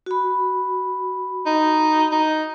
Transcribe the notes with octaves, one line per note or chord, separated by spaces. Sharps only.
F#4 B5
D#4
D#4